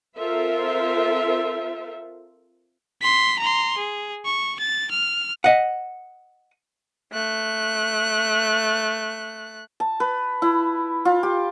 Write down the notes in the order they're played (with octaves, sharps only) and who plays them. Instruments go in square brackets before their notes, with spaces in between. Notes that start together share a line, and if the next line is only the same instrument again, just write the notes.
[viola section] C4 F4 A4 A#4 C5 E5
[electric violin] C6 B6
A#5 C6
G#4
C#6
A6
F6
[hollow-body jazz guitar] D#5 F#5
[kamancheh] A3 F#6
[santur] A5
B4
E4
F4
G4